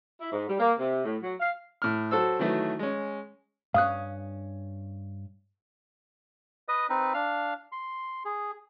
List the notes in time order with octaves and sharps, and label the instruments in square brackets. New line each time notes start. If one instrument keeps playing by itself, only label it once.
[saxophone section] E4
G#2
G3
A#3
C3
A2
F#3
F5
[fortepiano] A2 F6
F#3 F#4 A4 C5 E6
D#3 E3 F#3 A3
G#3 C#4
[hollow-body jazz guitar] G2 C#4 [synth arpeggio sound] F5 D#6 F#6
[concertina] B4 D#5 D#6
C4 D#4 B4
D4 F5 F6
C6
G#4